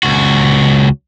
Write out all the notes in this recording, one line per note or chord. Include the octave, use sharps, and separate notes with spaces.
C#2 F#4